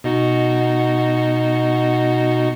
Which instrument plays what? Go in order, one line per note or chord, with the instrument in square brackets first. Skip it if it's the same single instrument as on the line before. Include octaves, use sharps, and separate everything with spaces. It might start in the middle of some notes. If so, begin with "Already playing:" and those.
[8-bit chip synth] B2 D#4 F#4